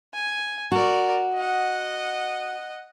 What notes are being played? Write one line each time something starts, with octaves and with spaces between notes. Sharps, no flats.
G#5
F#4 A#4 D5
D#5 F#5